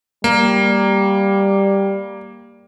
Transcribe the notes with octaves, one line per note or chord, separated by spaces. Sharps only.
G3 A#3